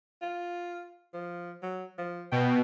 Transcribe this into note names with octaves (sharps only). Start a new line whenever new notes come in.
F4
F3
F#3
F3
B2 G5